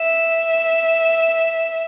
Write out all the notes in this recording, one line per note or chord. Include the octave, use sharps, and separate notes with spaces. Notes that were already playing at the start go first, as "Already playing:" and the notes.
Already playing: E5